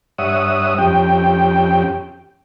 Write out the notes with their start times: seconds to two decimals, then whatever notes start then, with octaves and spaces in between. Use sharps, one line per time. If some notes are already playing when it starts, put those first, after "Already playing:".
0.18 G2 C#5 E5 F#5 D#6
0.78 F2 C#4 G4 G5